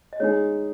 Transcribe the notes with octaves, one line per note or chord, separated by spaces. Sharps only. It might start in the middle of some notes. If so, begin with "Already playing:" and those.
D#5
G#3 D#4 G#4 C#5